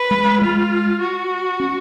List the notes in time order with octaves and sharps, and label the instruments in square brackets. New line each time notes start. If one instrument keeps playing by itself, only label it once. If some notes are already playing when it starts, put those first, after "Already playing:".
Already playing: [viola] B4
[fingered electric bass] G#3
[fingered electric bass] G#3 [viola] F4
[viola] F#4
[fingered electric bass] C#4